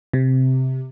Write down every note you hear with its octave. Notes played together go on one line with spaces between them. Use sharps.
C3